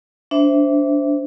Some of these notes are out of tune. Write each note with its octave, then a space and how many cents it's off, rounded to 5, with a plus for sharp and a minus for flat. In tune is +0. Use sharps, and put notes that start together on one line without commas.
D4 -20 C5 -5 E5 +0